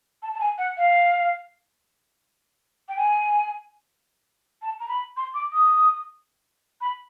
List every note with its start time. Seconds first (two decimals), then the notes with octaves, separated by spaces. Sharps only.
0.22 A5
0.34 A5
0.40 G#5
0.58 F#5
0.77 F5
2.88 G5
2.97 G#5
4.62 A5
4.80 A#5
4.88 B5
5.17 C6
5.34 D6
5.53 D#6
6.81 B5